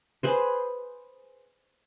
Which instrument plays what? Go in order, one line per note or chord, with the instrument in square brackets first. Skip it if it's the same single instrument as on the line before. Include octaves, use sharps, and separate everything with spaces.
[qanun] G#4 B4 C5